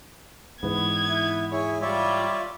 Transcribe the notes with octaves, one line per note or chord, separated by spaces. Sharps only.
G#2 E3 B3 G#6
E4
E4 G#4 C#5
G3 F4 C#5 D5 E5